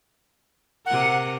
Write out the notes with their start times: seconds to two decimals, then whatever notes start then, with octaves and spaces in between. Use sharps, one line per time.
0.86 C3 A#4 F#5